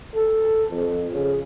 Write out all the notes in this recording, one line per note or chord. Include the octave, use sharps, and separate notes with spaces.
A4
F2
C#3